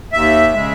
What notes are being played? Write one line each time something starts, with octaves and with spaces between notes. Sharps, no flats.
D#2 E5
C#3 G#3